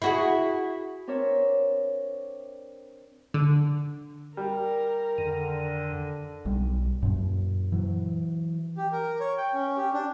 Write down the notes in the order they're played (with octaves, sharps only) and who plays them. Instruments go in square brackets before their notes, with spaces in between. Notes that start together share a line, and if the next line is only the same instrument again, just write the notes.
[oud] E4 F#4 G#4
[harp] C4 D4 A#4 C#5 E5
[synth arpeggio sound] D3
[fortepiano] G3 [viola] A#4
[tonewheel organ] F2 D#3 [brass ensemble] D3
[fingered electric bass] B1 G3
F#2 A#2
E3 F#3
[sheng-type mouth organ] G4
A#4
C#5
G5
C#4
G4
D4